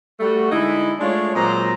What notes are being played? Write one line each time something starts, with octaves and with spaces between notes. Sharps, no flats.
G3 A3 F#4
D3 G#3 D#4 E4
G#3 A3 D4 F4 C#5
A#2 F#3 G#3 C4 C5 A#5